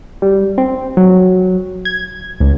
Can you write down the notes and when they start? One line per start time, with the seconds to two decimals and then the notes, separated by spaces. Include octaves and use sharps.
0.22 G3
0.58 C4
0.97 F#3
1.85 G#6
2.40 C#2